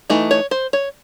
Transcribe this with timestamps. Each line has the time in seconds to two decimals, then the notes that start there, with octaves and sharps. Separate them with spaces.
0.10 E3 A3 D#4
0.31 C#5
0.51 C5
0.73 C#5